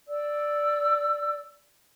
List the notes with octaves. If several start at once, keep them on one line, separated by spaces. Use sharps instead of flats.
D5 E6